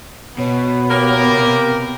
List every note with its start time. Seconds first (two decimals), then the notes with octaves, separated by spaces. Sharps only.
0.38 B2 B3 C#5
0.90 A#3 G4 A#4
1.32 C3